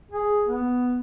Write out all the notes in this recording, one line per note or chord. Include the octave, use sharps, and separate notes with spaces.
G#4
B3